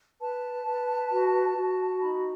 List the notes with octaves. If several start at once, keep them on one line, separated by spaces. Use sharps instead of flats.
B4 A5
B4
F#4
F#4
D#4 B5